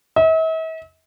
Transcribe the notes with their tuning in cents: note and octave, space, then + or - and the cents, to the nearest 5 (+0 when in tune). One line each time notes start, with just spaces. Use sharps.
E5 -45